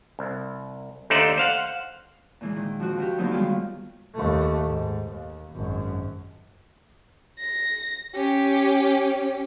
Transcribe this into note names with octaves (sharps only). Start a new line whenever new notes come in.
C2
D#2 D3 A3 D#4 C5 D5
C5 F5 F#5
A#2 E3 G#3
D#3
F3 C4 F#4
D2 F#4 G4
D3 F3 F#3 A#3 B3 D#4
D#3 G3 G#3 A#3 B3 F4
D#2 A3
G#2
D#2
G#1 F#2
A#6
C#4 G4